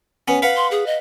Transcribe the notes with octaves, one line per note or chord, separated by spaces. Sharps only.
B3 C#4
B4 F5 F#5
C6
G#4
D#5